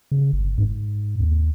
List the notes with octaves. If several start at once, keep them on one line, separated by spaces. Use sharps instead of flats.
C#3
G1
G#2
D#2